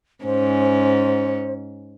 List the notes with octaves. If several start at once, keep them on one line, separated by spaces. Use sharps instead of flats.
G#2 C#4 C5